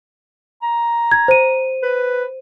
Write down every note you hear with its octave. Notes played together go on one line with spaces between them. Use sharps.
A#5
G#6
C5 D#7
B4